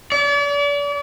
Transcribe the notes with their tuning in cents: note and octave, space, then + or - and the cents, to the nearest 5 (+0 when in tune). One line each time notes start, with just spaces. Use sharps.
D5 -40